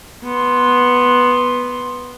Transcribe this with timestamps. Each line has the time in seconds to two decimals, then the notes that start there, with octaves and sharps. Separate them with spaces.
0.24 B3 C6